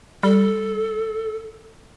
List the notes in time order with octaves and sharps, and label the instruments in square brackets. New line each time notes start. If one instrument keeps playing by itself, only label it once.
[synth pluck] G3 [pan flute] A4